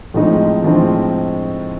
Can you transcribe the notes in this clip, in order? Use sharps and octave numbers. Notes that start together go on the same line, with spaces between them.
A2 F3 G#3 C4 D#4
A2 F3 G#3 C4 D#4